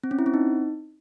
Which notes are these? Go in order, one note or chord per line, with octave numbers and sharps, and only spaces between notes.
C4
C#4
E4
C4
D#4